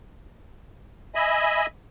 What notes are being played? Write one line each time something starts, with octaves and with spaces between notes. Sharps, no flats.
D#5 E5 G#5 B5